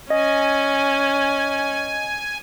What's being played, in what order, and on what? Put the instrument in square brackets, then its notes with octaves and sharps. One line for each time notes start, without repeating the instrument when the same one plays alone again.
[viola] C#4 [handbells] D#5 [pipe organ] G#5